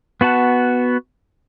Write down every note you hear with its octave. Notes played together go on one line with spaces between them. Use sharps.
B3 F#4 F#5 A5